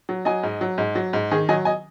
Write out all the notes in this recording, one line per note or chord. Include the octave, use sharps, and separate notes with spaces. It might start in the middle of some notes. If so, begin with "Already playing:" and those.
F#3
F#3 D#5 G#5
G#2
F#3
G#2
F#3
G#2
D#3 G#4
F#3 D#5 G#5
D#5 G#5